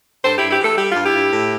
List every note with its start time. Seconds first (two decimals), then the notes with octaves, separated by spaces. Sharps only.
0.24 G2 A4 C5
0.38 G2 E4 G4
0.51 E4 G4
0.60 E3 A4
0.78 G3 G4
0.92 G2 F4
1.04 E4 G4
1.14 G2
1.32 A2